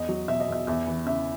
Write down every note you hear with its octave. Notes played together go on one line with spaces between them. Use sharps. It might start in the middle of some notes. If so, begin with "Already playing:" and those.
Already playing: E2 D#5
F#3
B2 E5
D#5
E2 E5
E2 E5
E3
C#3 E5